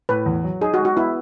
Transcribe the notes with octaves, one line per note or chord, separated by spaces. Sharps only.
A2 B4
E2
F#3
D#4 G#4
F#4
G#3
F#4
B3 E4